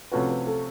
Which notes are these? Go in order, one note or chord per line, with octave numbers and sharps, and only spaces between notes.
C3 F3 A3 C#4 F#4 B4
B4
A4